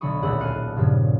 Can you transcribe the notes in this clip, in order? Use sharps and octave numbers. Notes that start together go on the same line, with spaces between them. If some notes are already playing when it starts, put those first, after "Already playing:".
B1 D3 F#3 B5 C#6 D#6
D#1 D2 G#4 E5 F#5 B6
F5 G#5 A5 F#6 C#7 D#7
G2 A#2 C#3 F3